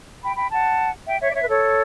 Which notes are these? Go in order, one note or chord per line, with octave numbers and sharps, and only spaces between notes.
G5 B5
G5 B5
F#5 A5
E5 G5
C#5 E5
D5
C#5 E5
B4
A4 C#5